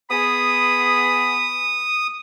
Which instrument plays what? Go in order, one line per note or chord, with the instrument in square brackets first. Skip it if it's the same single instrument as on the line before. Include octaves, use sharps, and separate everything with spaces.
[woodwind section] B3 G#4 B5 [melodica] D#6